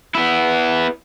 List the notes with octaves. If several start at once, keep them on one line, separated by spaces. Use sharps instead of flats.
B3 E4